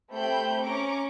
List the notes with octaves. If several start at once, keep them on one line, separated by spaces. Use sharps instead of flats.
A3 C4 G4 B5 G6
C#4 A#5 C#6 D6